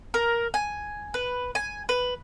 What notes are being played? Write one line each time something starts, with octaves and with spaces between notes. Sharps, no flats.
A#4
G#5
B4
G#5
B4